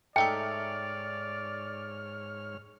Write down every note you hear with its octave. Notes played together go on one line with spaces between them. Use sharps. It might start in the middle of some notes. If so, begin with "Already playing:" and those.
G#2 A3 D#4 C#5 D5 E5 G5 F6